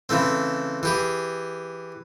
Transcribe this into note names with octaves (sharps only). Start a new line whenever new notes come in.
C#3 E3 A3 C4
E3 G4 G#4